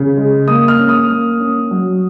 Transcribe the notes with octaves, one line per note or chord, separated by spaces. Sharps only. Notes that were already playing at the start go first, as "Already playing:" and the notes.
Already playing: C#3
G#3
A#3 D#6
F6
C#4
D#6
A#3
C#4
F#3